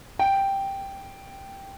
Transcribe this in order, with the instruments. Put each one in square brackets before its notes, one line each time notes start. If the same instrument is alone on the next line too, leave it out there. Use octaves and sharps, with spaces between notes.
[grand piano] G5